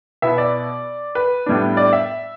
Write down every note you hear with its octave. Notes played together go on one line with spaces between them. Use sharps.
B2 B3 E4 E5
D5
B4
A2 G3 B3 D4
D5
E5